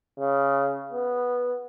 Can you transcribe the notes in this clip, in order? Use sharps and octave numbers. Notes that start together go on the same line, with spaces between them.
C#3
B3